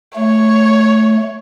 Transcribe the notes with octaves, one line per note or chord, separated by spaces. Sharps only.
A3 C#5